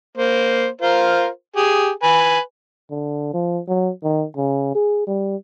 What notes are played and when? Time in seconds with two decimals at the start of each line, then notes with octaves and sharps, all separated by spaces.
0.17 A#3 C5
0.81 F4 A#4 C5
1.56 G4 G#4
2.03 B4 G#5
2.91 D3
3.33 F3
3.68 F#3
4.04 D#3
4.37 C#3
4.75 G#4
5.07 G3